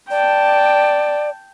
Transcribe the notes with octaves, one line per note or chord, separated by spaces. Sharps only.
D5 G5 A5